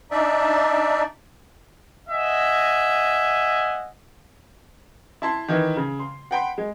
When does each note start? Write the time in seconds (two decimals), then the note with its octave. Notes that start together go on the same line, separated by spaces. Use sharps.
0.11 D4 D#4 D5 E5
2.09 D#5 E5 F#5 G#5
5.22 E4 A5 C6
5.48 D#3 E3
5.77 C#3
5.99 C6
6.31 F#5 G5 B5 C6
6.58 G#3